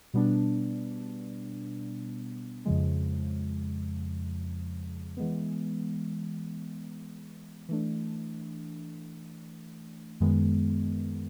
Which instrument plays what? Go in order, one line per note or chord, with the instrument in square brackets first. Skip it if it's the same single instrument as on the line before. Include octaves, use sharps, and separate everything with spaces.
[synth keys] B2 G3 B3 D4
F2 C#3 F3 G#3
E3 G#3 B3
E3 A3 D4
F#2 D#3 G#3 B3